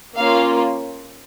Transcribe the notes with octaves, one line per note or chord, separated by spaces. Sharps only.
A#3 C#4 F4 F5